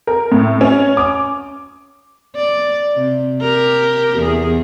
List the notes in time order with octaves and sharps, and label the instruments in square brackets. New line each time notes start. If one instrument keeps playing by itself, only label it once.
[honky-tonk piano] A#4
A2
C#4
D6
[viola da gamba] D5
C3
G4 A#4
E2 G#4